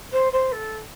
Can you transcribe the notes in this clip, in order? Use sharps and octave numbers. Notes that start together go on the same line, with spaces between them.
C5
C5
A4